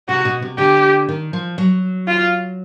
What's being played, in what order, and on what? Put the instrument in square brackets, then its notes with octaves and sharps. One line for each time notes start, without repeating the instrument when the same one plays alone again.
[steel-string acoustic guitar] C3 [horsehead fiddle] F#4
[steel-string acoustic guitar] B2
C3
[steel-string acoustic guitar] D3 [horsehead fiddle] G4
[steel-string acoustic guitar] D#3
F3
F#3
[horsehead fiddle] F4